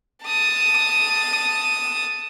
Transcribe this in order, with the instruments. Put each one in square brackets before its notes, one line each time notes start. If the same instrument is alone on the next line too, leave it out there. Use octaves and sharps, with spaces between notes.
[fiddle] A5 D#6